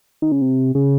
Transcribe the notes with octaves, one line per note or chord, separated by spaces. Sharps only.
D#3
C#3
C3
C#3